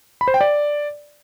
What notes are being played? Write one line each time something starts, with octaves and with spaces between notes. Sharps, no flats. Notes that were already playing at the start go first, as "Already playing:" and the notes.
B5
C5
G5
D5